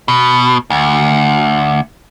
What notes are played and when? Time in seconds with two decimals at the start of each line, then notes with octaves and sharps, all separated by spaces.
0.08 B2
0.70 D2